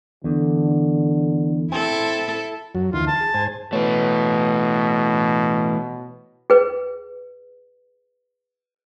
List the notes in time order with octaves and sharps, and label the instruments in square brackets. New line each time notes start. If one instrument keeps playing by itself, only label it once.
[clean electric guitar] E2 [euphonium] D3
[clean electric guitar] C4 [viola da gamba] E4 A4
[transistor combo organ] F#2 F#3
[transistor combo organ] D2 D#3 E3 [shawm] F4
[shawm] A5
[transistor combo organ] G#4
G#2 C5 G#5
[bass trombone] B2 [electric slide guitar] E3 A3 [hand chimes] B4 C#5
[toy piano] G#4 B4